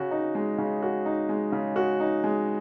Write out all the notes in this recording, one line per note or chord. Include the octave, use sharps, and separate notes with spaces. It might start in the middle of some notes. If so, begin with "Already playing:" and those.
Already playing: C#3 F#4
D#4
G#3
C#3
F#4
D#4
G#3
C#3
F#4
D#4
G#3